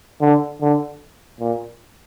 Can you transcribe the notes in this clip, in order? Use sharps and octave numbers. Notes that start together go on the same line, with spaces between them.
D3
D3
A#2